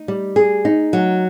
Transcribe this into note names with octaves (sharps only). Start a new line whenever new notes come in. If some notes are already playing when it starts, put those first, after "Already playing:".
Already playing: D#4
G3
G#4
D#4
F#3